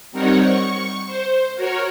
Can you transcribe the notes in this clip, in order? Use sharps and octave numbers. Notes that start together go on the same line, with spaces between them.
G3 C4 D#4 A#4 C#5 F#5
C#6
C5
F#4 A#4 C#5